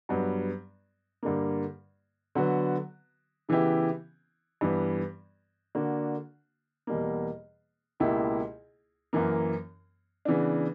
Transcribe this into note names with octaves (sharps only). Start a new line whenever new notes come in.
G2 F#3 B3
G2 D3 A#3
D3 F#3 B3 F#4 B4
C#3 E3 B3 E4 G4
G2 E3 B3
D3 A#3 D4 F#4
E2 B2 G3 A#3
C#2 B2 A#3 E4 G4
F#2 E3 A#3
C#3 E3 B3 D4